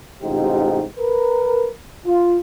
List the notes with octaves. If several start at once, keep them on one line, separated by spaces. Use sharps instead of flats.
A1 G#2 C3 D#4 F4 G4
A#4 B4
F4